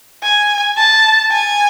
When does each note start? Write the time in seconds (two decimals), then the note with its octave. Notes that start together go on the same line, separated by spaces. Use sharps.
0.23 G#5
0.77 A5
1.31 G#5